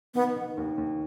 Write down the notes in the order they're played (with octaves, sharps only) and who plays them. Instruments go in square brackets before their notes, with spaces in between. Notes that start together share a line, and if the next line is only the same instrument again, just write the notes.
[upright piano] D#3 [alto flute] B3
[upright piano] D#3
D#2
D#2